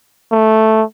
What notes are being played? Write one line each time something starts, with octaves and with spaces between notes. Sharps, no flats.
A3